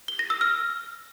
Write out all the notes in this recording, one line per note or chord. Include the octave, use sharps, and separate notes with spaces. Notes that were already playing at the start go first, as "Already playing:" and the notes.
G7
A#6
E6
F6